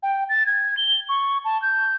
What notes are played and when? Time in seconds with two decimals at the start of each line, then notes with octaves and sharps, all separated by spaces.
0.03 G5
0.29 A6
0.46 G#6
0.77 G7
1.09 C#6
1.45 A5
1.62 G6